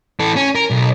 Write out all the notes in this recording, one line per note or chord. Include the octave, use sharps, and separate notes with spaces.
E3 A4
C#4
A#4
B1